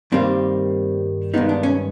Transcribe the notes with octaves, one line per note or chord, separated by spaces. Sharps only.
G2 D#3 G3 A#3 C4
G2 D#3 G#3 B3 D#4
D4
C#4